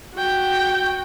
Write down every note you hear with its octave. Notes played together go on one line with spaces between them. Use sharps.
F#4 G5